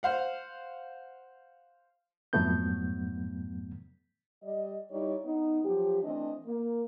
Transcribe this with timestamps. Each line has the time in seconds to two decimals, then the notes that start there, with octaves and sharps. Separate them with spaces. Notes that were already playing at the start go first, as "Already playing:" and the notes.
0.03 C5 F5 F#5
2.33 F2 G#2 F#3 A3 B3 G6
4.44 G3 D5 D#5
4.91 G3 D#4 E4 C#5 D5
5.25 B3 D#4
5.64 F3 F#3 G4
6.03 E3 A3 C4 D4 D#5
6.46 A#3